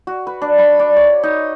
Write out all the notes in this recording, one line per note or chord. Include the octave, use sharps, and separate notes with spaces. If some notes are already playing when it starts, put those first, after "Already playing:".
F#4
B4
D4
B5
D4
C#5
D#4